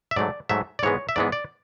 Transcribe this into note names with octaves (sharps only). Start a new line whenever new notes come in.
E5
G#2 F#3 A3 D5
G#2 F#3 A3 E5
D5
G#2 E3 G#3 B3 C#5
E5
G#2 E3 G#3 B3 D5
D5